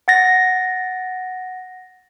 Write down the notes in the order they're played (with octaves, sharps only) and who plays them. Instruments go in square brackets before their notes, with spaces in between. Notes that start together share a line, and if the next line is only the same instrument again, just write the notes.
[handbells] F#5 A6 A#6